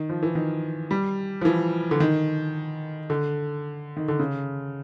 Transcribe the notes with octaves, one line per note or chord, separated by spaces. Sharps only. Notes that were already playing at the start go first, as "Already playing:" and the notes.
Already playing: D#3
F3
E3
D#3
G3
F3
E3
D3
D#3
D3
D#3
D3
C#3